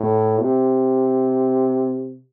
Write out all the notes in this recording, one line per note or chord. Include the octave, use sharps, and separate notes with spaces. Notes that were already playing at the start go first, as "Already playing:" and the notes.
Already playing: A2
C3